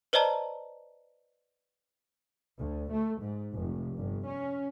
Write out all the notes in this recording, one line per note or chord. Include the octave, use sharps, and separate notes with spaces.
B4 C5 D5 D#5 A5 A#5
D2
A3
G#2
F1
G1
C#4